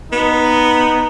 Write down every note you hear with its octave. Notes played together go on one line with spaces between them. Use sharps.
B3 D#4